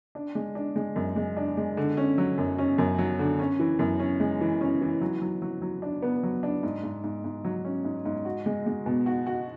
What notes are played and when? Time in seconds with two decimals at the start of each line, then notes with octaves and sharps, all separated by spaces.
0.15 D4
0.35 G#3
0.55 D4
0.76 G#3
0.96 F#2
1.16 G#3
1.37 D4
1.57 G#3
1.77 D3
1.97 C#4
2.18 F#3
2.38 F#2
2.58 C#4
2.78 F#2
2.98 F#3
3.19 D3
3.39 C#4
3.59 E3
3.79 F#2
4.00 C#4
4.20 G#3
4.41 E3
4.61 C#4
4.81 E3
5.01 F#3
5.21 F#3
5.42 F#3
5.62 F#3
5.82 D4
6.02 B3
6.23 F#3
6.43 D4
6.63 G#2
6.83 G#2
7.04 G#2
7.24 G#2
7.44 F#3
7.65 C#4
7.85 G#2
8.05 G#2
8.25 F#4
8.46 G#3
8.66 G#3
8.86 B2
9.06 F#4
9.26 F#4